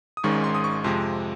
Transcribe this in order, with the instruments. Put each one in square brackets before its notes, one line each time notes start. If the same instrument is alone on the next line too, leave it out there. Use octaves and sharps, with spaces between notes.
[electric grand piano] D#6
G#1 G#2 D#3 G#3 C#4 C#6
C6
D#6
C#6
F2 C3 F3 G#3 C6